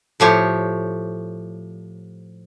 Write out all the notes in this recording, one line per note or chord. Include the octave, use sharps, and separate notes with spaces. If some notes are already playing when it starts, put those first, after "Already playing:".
A2 F3 G4 C#5